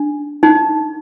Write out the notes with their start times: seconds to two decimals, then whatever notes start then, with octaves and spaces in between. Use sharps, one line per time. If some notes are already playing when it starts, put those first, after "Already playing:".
Already playing: D4
0.43 D#4